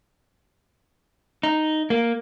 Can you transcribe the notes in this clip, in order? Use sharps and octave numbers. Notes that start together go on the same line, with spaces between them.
D#4
A#3